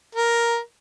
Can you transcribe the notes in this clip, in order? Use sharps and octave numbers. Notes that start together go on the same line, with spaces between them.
A#4